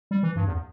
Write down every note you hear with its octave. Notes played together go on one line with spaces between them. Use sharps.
G3
E3
G2
E2